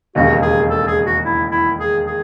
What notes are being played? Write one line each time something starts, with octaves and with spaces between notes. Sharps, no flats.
E1 D#2 C#3 F#4
G#4
A4
G#4
F#4
E4
E4
G#4
G#4